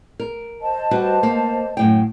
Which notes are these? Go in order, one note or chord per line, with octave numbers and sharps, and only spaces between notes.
A#4
C5 D#5 A5
G3 F#4 B4
A#3
F#2 A2 G5